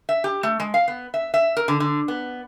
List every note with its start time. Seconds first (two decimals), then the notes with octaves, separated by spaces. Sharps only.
0.09 E5
0.24 G4
0.43 A3
0.60 G#3
0.74 F5
0.88 B3
1.14 E5
1.34 E5
1.57 A#4
1.68 D3
1.80 D3
2.08 B3